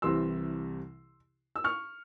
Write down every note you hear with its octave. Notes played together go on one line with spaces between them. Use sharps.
C2 C3 E3 G3 C6 E6
E6
C#6 F6